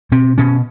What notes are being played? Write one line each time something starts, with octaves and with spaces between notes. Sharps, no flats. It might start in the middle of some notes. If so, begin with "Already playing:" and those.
B2 C4
B2 C#4